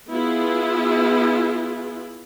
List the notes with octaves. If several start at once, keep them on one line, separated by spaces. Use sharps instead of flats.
B3 E4 F4 G#4